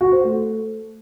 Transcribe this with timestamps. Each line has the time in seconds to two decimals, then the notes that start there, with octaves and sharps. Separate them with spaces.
0.01 F#4
0.12 C5
0.23 A3